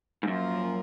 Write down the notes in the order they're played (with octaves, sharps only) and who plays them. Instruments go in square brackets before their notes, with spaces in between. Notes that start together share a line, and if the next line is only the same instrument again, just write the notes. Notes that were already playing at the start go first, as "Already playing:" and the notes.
[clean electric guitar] G#2
[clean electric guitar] F#2 [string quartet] F3 A#3 F4 A#4